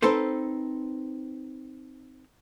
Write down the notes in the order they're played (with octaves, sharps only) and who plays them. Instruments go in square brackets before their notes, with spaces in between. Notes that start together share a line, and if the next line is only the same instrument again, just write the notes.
[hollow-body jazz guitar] C4 D#4 A4 B4 C5